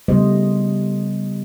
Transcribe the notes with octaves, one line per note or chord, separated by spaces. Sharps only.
C#3 G3 A3 B3 C5 D#5